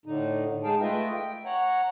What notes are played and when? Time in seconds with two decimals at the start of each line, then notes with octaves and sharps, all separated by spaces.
0.06 A2 D3 D#4
0.63 G#3 D#4 G#4 F5 G5 A5
0.81 A3 F4 B4 D#5 E5 G5
1.14 G5
1.45 C#5 F#5 A#5